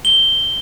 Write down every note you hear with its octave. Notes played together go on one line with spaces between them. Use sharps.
G7